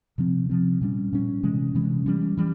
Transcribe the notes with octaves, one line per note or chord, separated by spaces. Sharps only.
C3 F3 C4
C3 F3 C4
A#2 G3 C#4
A#2 G3 C#4
C3 E3 G#3 C#4
C3 E3 G#3 C#4
E3 G3 C#4
E3 G3